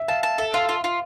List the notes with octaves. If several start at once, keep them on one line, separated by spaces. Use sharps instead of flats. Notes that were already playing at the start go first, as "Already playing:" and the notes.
Already playing: E5
F5 A5
A5
A4 E5
F4 F5
F4
F4